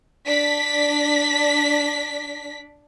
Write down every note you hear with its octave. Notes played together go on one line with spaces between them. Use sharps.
D4 B6